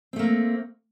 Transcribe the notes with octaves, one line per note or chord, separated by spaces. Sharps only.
A3 A#3 C4